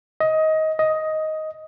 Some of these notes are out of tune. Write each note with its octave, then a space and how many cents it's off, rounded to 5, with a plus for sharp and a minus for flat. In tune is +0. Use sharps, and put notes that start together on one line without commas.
D#5 +20
D#5 +10